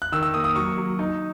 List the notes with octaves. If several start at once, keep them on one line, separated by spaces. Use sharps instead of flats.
F#6
D#3 E6
E6
A#3 D#6
D#6
F#3 C#6
F#3
D#4